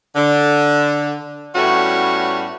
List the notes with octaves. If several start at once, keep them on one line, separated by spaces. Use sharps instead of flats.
D3
A2 G3 A3 B3 C#4 F#4